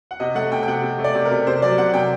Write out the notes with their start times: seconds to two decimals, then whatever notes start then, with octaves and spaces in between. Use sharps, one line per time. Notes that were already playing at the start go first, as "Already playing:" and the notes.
0.11 F#5
0.20 C3 D#5
0.35 A3 F#5
0.52 C3 G5
0.63 G5
0.68 C3 F#5
0.83 C3
0.99 A3
1.04 D5
1.15 C3
1.25 A#4
1.31 C3
1.47 C3 C5
1.62 F#3 D5
1.78 C3 F#5
1.94 C3 G5